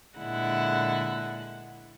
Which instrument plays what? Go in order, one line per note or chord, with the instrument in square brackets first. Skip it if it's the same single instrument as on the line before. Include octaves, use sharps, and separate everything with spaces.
[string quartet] A#2 D3 G#3 E4 F#5